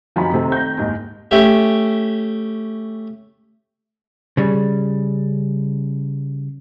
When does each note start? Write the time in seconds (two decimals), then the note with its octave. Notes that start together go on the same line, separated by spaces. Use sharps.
0.16 F#2 C3 D#3 F3 G#5 B5
0.34 C3 D#3 A3 C4
0.52 G6 A#6
0.77 F#1 D#2 G#2
1.31 A3 C#4 G4 E5
4.37 C#3 G3